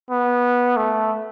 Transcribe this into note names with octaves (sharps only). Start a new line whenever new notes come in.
B3
A3